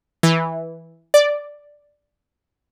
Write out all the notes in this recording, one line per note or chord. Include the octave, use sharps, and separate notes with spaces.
E3
D5